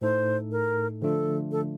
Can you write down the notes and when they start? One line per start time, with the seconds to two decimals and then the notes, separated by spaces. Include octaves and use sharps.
0.01 A2 A3 D#4 A4 C5
0.51 A#4
1.02 D3 F3 A3 D4 F4 A4
1.51 A4